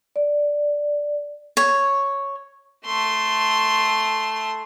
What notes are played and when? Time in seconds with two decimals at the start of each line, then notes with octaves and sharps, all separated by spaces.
0.16 D5
1.57 C#5
2.85 A3 C6